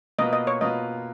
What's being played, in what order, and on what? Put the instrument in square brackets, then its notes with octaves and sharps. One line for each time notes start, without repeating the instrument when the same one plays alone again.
[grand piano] B2 A#3 F4 B4 [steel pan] D#5
[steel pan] D#5
C#5
[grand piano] B2 A#3 F4 B4 [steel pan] D#5